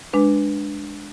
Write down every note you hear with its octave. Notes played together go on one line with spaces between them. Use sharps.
G#3 D4 B4